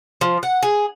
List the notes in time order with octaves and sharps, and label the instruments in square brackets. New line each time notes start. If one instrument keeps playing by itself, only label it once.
[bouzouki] F3
F#5
G#4